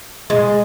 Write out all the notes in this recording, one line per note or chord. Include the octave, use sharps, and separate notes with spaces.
G#3